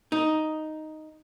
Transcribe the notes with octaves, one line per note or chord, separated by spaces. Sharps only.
D#4